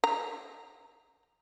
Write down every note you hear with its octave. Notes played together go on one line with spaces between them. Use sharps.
A#5